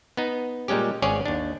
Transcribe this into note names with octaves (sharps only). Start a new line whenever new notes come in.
B3 D#4
A#2 G3 G#3 C#4 G4
G#1 C#4 G#4 C#5 D5
D#2 D4